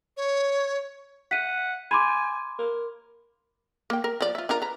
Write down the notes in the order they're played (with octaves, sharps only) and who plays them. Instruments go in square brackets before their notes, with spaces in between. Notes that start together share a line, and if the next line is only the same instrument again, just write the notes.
[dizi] C#5
[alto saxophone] F#5 [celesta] B6 D#7
[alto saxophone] G#5 [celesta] B5 C6 D6
[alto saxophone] A#4
[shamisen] A#3 G5
A#4
F3 D5
F4 E5
D4 F4 A#4
B4 A#5